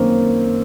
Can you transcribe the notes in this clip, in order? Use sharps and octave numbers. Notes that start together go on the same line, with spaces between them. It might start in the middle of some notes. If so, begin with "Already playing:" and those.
Already playing: F#2 D#3 A#3 C4 C#4